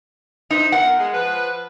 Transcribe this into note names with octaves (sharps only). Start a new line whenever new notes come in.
D#4 E4 B4 C5
B3 F4 A#4 F#5
G#3
F3 B4